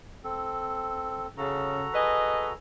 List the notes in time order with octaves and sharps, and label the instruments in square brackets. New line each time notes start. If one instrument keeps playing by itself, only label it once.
[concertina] C4 A4
[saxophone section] C#3 [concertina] F#4 A4 A#5
[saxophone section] G#4 B4 D#5